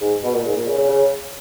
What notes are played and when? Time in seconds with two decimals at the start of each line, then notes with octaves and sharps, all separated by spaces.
0.01 G#2
0.23 B2
0.34 A#2
0.45 G#2
0.56 A#2
0.67 C#3
0.78 C#3
0.89 C#3